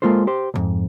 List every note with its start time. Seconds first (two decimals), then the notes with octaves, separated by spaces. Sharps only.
0.02 G#3 A#3 F4 A4 C5
0.27 G4 C5
0.54 C2 F2 G#2